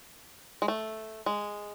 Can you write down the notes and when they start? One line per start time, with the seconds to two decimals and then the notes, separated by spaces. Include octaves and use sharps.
0.62 G#3
0.68 A3
1.26 G#3